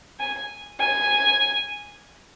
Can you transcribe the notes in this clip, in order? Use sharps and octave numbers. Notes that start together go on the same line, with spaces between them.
G#5
G#5